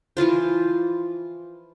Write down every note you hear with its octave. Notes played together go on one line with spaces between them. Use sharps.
E3 F3 F4 C5